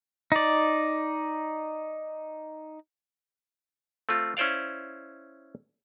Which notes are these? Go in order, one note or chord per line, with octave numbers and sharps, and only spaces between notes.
D#4 D5
A3 C4 F4
C#4 E4 C5 D5 F5